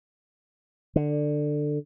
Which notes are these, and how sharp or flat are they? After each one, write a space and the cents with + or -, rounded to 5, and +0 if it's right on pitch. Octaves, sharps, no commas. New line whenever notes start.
D3 +15